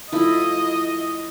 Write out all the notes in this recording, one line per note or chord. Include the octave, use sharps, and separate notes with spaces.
F3 A3 E4 D#5